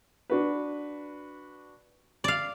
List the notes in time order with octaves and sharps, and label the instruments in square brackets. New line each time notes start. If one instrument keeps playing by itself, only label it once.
[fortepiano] D4 F#4 B4
[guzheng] D5 F5